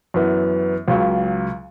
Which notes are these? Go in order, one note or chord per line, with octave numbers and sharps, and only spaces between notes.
F#2 E3 B3
C#2 C#3 F#3